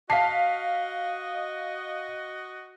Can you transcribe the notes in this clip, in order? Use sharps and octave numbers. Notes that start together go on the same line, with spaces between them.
F#4 D#5 F5 A5 B6 C7